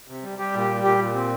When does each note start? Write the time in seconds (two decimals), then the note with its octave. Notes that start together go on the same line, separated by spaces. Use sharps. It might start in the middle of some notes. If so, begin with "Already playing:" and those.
0.08 C3
0.22 G3
0.38 G3 G4
0.54 A#2
0.61 G4
0.69 G3
0.84 A#2 G4
0.99 A#2
1.15 C4